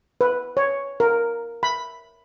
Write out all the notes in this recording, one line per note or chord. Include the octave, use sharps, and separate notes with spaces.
B4
C#5
A#4
B5